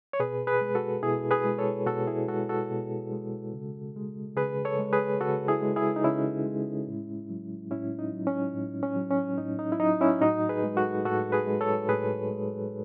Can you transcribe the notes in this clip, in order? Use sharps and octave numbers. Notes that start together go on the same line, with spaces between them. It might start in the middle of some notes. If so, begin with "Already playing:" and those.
C#5
B2 G#4 B4
G#4 B4
G#3
F#4 A4
B2 E4 G#4
G#4 B4
G#3
A4 C#5
B2 F#4 A4
E4 G#4
G#3 F#4 A4
F#4 A4
B2
G#3
C#3
G#3
C#3 G#4 B4
A4 C#5
G#3
G#4 B4
C#3 F#4 A4
E4 G#4
G#3
E4 G#4
D#4
C#3 C#4 E4
G#3
A2
F#3
A2 C#4 E4
D#4
F#3
C#4
A2
C#4
F#3
C#4
A2 D#4
D#4
E4
F#3 D#4
C#4 E4
A2 D#4 F#4
G#4 B4
G#3
F#4 A4
A2 F#4 A4
G#4 B4
G#3
A4 C#5
A2 G#4 B4
G#3